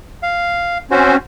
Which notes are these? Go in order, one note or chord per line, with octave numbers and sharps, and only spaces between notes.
F5
C4 C#4 F#4 C5